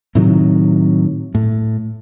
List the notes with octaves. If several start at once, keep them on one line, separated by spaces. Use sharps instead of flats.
A2 C3 D#3 F#3
A2